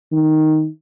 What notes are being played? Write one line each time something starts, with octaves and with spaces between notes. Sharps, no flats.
D#3